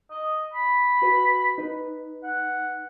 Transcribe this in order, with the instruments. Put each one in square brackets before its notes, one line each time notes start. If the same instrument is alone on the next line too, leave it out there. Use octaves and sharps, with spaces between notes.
[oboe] D#5
B5
[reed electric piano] F#4 B4
D#4 B4
[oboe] F#5